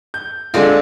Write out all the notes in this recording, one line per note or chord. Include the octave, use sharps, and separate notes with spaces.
G6
D3 G#3 C4 D4 F4